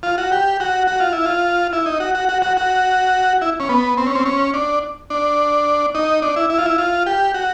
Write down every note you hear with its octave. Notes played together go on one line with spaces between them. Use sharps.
F4
F#4
G4
F#4
F#4
F4
E4
F4
E4
D#4
F#4
F#4
F#4
F#4
F#4
E4
C#4
B3
C4
C#4
C4
C#4
D4
D4
D#4
D4
E4
E4
F4
E4
F4
G4
F#4